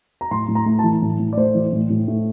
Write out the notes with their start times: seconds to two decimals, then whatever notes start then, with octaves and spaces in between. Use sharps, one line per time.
0.21 A#5
0.31 A2 C6
0.48 A2
0.55 A#5
0.66 A3
0.79 A5
0.84 E3
1.02 A2
1.20 A2
1.33 D5
1.37 A3 C5
1.55 E3
1.73 A2
1.90 A2
2.08 A3